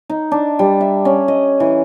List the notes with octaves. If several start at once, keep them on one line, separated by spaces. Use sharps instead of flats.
D#4
D4
G3
E5
C#4
D#5
E3